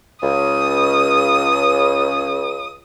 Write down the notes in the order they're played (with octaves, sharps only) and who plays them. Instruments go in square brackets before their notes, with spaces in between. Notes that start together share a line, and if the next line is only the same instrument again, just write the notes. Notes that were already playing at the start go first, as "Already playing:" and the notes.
[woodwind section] C#2 [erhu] D#6